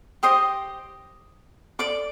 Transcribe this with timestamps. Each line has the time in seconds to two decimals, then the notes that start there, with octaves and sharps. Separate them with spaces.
0.23 G4 C5 D#5 D#6
1.79 A4 D5 D6